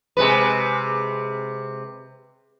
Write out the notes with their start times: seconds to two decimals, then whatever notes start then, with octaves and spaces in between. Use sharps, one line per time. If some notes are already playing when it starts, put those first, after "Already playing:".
0.17 C3 G#3 B4